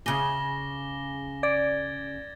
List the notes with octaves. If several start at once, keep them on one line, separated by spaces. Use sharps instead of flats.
C#3 G#4 D6 A#6 G7
D5 G#6 A6